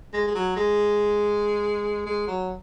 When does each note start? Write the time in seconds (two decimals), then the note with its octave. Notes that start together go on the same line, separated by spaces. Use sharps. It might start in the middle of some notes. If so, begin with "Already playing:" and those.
0.14 G#3
0.27 G#3
0.35 F#3
0.56 G#3
2.06 G#3
2.27 F#3